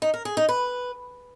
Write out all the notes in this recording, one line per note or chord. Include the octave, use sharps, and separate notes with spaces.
D#4
A#4
G#4
D#4
B4